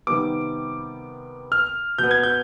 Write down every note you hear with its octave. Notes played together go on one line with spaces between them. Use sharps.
C3 D#3 G3 B3 D6
F6
B2 B3 G6
G#6
G6